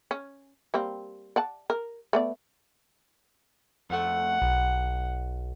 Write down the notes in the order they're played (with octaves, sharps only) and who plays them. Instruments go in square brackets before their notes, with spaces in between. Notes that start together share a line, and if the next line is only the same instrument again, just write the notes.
[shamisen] C#4
G3 A#3 C4
D5 F#5 A5
A#4
A3 B3 D5
[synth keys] F2 A3 [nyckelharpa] F#5
[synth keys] B1